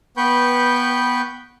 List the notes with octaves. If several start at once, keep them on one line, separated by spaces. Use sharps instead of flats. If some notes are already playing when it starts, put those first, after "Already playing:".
B3 B4 G5 B5 C#6 G6